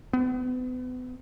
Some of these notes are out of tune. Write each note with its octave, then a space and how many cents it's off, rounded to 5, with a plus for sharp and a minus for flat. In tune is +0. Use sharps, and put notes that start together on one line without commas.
B3 +35